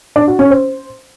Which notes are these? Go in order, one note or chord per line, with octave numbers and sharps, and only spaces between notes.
D4
F#4
C#4
C5